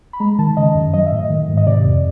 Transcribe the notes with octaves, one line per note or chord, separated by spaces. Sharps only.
B5
G#3 A#5
D#3 A5
C#3 D#5
F#2
F#3 D#5
E5
A2
D#5
D#3
G#2
D#5
C3 D5
F2